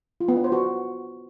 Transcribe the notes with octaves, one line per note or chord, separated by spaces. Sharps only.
F4
B3
D4
C5
F#4